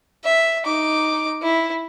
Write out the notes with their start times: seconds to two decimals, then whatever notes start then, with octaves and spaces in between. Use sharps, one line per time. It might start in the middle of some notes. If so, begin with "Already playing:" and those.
0.24 E5
0.65 D#4 D6
1.43 E4